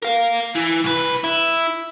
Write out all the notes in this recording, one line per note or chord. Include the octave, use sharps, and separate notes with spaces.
A#4 F5
E3
C2 B4
E4